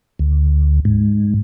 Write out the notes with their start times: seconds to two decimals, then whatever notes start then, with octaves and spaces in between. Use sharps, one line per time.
0.19 D2
0.85 G#2